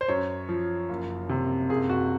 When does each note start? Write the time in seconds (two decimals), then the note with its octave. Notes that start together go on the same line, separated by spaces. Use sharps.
0.01 C5
0.08 F#2 C#5
0.49 F3
0.89 F#1
1.29 C3
1.69 F#1 G#4
1.90 F#4